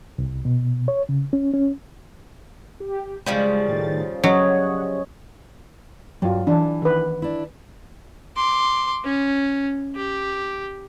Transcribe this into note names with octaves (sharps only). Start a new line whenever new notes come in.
C2
B2
C#5
C#3
C#4
C#4
G4
C#3 F3 G3 G#3
A2 D#3 A6
F#3 C#4 C#5 D#5 F#5
G2 F#3 F4
E3 D4
D#3 B4
D4 E4
C6 D6
C#4
G4